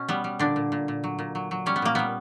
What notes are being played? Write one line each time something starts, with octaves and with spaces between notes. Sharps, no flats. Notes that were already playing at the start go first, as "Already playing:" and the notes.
Already playing: B2 C#4
G3 B3
G3
A#2 D3 D4
A#2
A#2
A#2
F#3
A#2
F#3
F#3
G3 C#4
B3
A#2 A#3
G3 B3